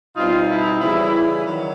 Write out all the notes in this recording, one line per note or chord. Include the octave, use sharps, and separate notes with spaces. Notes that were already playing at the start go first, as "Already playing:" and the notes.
B2 G3 C4 D#4 F4
E4
C#3 E3 G3 E4
D#3 F#3